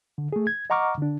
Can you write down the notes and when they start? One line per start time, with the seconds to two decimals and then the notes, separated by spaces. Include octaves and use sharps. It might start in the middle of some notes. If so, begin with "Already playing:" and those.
0.18 D3
0.33 A3 G#4
0.47 G#6
0.70 D#5 F#5 A#5 C#6 D6 F6
0.98 D3 D4